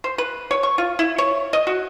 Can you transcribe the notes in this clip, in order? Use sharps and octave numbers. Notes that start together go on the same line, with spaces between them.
C5
B4
C#5
C#6
F4
E4
C#5
D#5
F#4